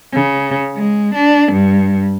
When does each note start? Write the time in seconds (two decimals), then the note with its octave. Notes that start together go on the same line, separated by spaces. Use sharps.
0.13 C#3
0.76 G#3
1.15 D4
1.52 G2